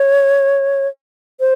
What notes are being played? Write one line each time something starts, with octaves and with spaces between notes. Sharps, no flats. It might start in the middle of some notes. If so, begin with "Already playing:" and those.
Already playing: C#5
C5